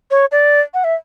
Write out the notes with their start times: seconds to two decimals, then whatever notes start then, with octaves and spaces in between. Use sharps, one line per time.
0.11 C#5
0.32 D5
0.74 F#5
0.84 E5